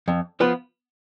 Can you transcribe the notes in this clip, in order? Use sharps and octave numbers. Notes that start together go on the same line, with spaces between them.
F2
F3 B3 F4 B4